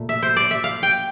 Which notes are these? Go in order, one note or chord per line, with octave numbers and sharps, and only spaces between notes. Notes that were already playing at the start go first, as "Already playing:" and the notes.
Already playing: A#2 A3
E5
C5
D5
E5
F5
G5